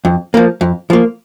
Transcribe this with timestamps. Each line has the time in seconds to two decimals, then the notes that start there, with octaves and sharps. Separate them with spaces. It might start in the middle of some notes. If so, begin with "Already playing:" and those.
0.05 F2
0.34 F3 A#3
0.61 F2
0.90 F3 A#3